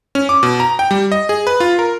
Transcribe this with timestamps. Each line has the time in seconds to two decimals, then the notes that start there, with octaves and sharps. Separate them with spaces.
0.15 C#4
0.29 D6
0.43 B2
0.60 A#5
0.79 G5
0.91 G3
1.12 D#5
1.29 G#4
1.47 B4
1.60 F4
1.79 A#4